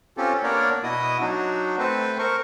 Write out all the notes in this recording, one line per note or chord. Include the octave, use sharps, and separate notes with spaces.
C4 C#4 F4 G4 A4
A#3 B3 D4 A#4 C#5 D5
B2 E4 F#4 D#5 D#6
F#3 D4 D#4 F#4
A3 C4 A4 B4 C5
A#4 C5 C#6